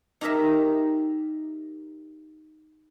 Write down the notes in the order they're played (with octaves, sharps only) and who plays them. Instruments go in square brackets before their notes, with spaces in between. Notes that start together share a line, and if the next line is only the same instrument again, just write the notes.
[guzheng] D#4 G4 G#4 A#4 D#5 E5